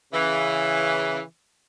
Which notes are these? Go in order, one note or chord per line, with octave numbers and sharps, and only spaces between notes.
C#3 E3